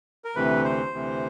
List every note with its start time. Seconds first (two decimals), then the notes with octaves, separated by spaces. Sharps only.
0.24 A#4
0.35 D2 C3 E3 B4
0.64 C5
0.93 D2 C3 E3